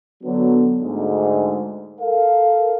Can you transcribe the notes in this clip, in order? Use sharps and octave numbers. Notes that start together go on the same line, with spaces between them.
D3 F#3 B3
D2 G#2
A4 A#4 F5